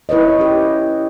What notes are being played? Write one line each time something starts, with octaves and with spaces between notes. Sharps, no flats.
E4 B4 C#5 D#5
C#4 G4